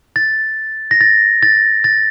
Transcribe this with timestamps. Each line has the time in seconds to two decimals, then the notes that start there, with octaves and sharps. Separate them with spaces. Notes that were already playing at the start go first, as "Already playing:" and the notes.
0.16 A6
0.91 A#6
1.01 A6
1.43 A6
1.84 A6